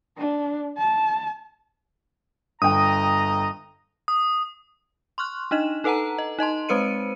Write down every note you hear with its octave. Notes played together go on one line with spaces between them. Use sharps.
D4
A5
G1 D#5 G5 A#5 D#6
D#6
C6 C#6 F6 F#6
D4 D#4 D#5 E7
D#4 A4 B4 F#5 A5 A#5
D#5
D#4 D#5 A5 C6
G#3 C4 B4 C5 C#7 D#7